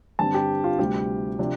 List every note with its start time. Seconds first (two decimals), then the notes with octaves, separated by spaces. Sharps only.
0.19 G2 D3 G3 C4 A5
0.34 G4
0.64 F4
0.79 D2 C3 G3 G4
1.39 C3 F3 D4